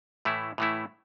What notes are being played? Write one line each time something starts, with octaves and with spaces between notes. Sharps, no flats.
A2 E3 A3 E4
A2 E3 A3 E4